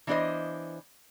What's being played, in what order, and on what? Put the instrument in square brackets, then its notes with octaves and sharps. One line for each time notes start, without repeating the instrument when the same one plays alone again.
[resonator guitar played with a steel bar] E3 B3 D4 G4 C5 D#5